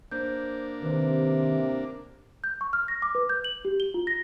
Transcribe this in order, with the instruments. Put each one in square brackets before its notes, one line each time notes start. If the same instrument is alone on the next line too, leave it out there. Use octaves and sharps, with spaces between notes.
[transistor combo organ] A#3 D4 [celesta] C5 G6
[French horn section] C3 [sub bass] D#3 [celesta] B4 C5
[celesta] G6
C#6
F6
A#6
D6
B4
G6
F#7
G4
G7
F4
A#6